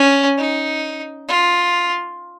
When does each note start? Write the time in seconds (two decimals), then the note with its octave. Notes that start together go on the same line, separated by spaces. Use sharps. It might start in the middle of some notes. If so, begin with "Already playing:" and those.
Already playing: C#4
0.38 D#4
1.28 F4